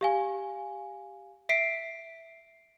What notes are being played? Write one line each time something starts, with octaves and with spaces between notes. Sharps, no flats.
G4 F5 G#5
E5 B6 C7 D7